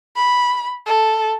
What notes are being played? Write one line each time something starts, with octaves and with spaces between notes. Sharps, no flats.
B5
A4